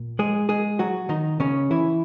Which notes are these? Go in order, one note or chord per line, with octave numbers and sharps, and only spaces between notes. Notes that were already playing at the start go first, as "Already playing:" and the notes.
Already playing: A#2
G#3 G#4
G#3 G#4
F#3 F#4
D#3 D#4
C#3 C#4
E3 E4